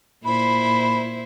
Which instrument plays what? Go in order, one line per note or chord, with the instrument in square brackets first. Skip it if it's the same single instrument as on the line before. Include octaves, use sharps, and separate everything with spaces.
[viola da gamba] A#2 E4 C5 [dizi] B5